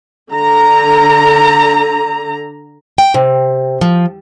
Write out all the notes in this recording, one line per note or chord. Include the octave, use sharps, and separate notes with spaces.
D3 A#5
G5
C3
F3